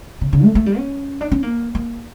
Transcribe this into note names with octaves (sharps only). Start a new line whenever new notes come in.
C#3
C#3
A3
A3
G3
C#4
D4
C#4
A#3
A#3